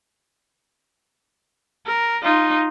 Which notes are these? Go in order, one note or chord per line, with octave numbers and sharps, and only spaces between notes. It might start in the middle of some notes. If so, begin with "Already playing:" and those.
A#4
D#4 F4